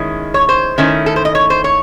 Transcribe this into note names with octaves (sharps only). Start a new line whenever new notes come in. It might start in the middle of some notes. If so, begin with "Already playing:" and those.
Already playing: D#3 G#3 C#4 E4
C#5
C5
D#3 A3 C#4 E4
A4
C5
D#5
C#5
C5
C#5